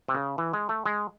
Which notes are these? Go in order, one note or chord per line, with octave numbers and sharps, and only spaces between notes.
C3
C#3
E3
G#3
A3
G#3